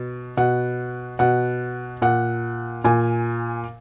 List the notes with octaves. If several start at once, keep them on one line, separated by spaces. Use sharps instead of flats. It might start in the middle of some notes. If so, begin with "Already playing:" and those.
Already playing: B2
B2 F#5
B2 F#5
A#2 F#5
A#2 G#5